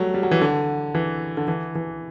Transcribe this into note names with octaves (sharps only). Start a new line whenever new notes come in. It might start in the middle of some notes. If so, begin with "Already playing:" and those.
Already playing: F#3 G3 A3
G3
F#3
E3
D3
E3
D3
E3
E3